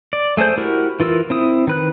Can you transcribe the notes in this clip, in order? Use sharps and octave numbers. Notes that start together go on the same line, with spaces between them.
D5
A3 G#4 A4 C5 G6
E4 F#4 G4 A#4
E3 F4 A#4 E6
C4 E4 D#6
D#3 B4 F#6